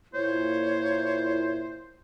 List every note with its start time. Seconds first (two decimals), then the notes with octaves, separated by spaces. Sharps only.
0.14 A#2 E4 C5 C#5